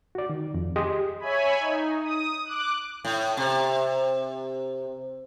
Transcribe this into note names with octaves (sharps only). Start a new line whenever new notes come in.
F#4 D5
D#3
F2
G4 G#4 D#5 C6 D#6
C#5 E5 G#5 B5
D#4
D#6
D6 F#6
A2
C3